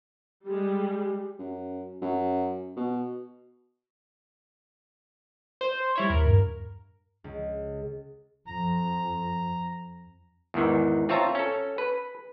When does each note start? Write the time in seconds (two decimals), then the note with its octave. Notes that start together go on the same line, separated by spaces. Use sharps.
0.45 G3 G#3 G4
1.39 F#2
2.02 F#2
2.77 B2
5.61 C5
5.96 G3 E4 C#5
6.10 D#2 A#4
6.26 G2
7.24 C#2
8.47 F2 A#5
10.54 E2 G#2 D#3 E3
11.09 C4 F4 C#5 E5 A5 A#5
11.35 C#4 A4
11.78 B4